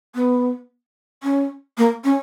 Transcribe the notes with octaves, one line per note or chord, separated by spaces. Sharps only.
B3
C#4
A#3
C#4